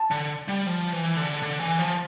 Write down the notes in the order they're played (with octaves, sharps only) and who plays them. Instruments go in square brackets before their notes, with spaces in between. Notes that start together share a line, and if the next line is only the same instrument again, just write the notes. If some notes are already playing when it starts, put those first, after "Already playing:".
Already playing: [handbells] A5
[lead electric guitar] D3
G3
F3
E3
D3
D3
E3
F3